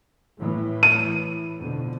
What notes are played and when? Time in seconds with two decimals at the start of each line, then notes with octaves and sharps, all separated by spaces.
0.38 A2 E3
0.83 D#7
1.58 F2 B2 D3